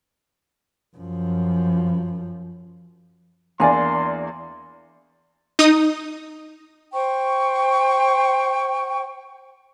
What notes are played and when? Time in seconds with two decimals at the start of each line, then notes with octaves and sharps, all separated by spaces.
0.96 F#2 F3
3.60 E2 A#3 D4 D5 G#5 C6
5.59 D#4 D#6
6.93 C5 G5 C#6